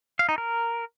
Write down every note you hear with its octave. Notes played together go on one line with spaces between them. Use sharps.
F5
D#4
A#4